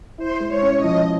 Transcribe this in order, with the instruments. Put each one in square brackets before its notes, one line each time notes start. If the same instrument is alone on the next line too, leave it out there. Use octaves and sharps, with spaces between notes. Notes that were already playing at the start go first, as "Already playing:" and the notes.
[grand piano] E4 [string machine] C5
[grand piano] G#3
[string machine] C#5
[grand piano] C#4
[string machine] D#5
[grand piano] F3